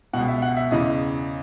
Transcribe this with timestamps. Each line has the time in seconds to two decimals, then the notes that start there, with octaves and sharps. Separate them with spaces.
0.13 B2 F#5
0.17 C#2
0.28 E5
0.42 F#5
0.57 E5
0.71 E2 C#3 E3 D#5